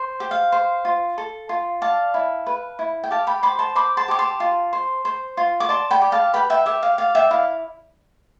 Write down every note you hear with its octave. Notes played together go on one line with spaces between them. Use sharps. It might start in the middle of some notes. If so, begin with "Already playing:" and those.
Already playing: C5
G4
F5
C5
F4
A4
F4
D5 F5 A5
E4
B4
E4
G5
G4 F5 A5
G5 B5
C5 B5 D6
A5 C6
C5 B5 D6
A5 C6
G4 D6
A5 C6
F4
C5
C5
F4
D6
D5 A5 C6
G5 B5
G4
F5 A5
B4 G5 B5
E5 G5
G4 E5
F5
D5 F5
E5 G5
E4 F5